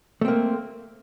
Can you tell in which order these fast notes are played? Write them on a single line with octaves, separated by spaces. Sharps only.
A3 C4 A#3